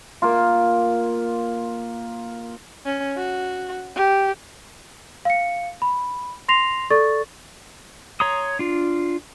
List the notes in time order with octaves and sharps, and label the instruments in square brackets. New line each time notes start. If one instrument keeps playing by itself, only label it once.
[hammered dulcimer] A#3 F4
[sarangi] C#4
F#4
G4
[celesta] F5 C#7
B5
C6 A#6 C7 F7
A4 D5 C#6 A6
[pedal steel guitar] C#5 A#5 C6 D#6
D4 F4